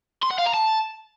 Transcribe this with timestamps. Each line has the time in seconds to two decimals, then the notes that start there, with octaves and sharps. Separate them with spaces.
0.23 C6
0.31 F#5
0.38 F5
0.46 A#5
0.54 A5